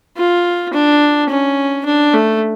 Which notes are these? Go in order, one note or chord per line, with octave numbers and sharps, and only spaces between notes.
F4
D4
C#4
D4
A3